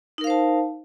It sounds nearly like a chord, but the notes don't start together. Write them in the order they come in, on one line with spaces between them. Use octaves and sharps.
D#4 A#4 F5 C5 A5